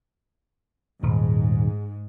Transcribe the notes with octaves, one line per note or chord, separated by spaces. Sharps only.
D#1 G#2